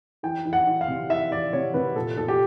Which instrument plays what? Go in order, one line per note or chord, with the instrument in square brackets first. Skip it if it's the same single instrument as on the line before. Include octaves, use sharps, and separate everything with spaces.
[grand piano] E3 G5
E3
F#5
E3
F5
C3
E3 E5
E3 D5
C3 C#5
C3 B4
A#2 A4
A#2 A4
G4